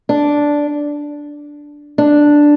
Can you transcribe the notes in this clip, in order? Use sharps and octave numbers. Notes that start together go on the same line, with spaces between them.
D4
D4